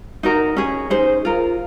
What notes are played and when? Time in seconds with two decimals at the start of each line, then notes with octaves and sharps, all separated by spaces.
0.23 D#4 F#4 A#4
0.57 C#4 G#4
0.90 D#4 G#4 C5
1.25 F4 A#4